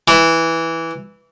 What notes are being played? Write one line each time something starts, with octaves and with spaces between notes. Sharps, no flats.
E3